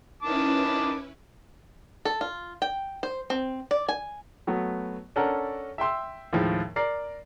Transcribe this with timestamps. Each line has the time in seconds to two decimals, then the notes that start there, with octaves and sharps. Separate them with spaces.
0.22 D#3 C#4 E4 B4 A5 D6
2.05 A4
2.21 F4
2.62 G5
3.03 C5
3.30 C4
3.71 D5
3.89 G#5
4.47 F#3 A3 B3
5.16 C#4 D4 A4 A#4 F#5
5.78 E5 G5 C6 E6
6.33 D#2 A2 F3 G#3
6.76 A#4 D5 C7